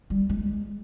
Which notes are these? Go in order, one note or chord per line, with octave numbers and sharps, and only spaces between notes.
G3
G#3